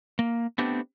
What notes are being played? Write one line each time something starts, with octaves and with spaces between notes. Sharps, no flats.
A#3
A3 B3 C4 D4 G4